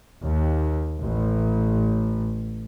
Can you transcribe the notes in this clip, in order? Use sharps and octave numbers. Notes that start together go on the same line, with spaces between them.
D#2
A1